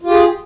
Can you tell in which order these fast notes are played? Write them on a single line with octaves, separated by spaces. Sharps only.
F4 G4 G#4